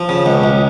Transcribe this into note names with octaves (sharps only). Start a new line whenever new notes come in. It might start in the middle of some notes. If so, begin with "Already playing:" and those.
Already playing: F3
C#3
C#2
C#2